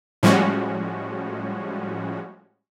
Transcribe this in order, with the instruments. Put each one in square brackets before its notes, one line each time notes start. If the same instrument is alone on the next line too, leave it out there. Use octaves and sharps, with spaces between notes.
[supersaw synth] A2 F3 G3 G#3 C#4 F#4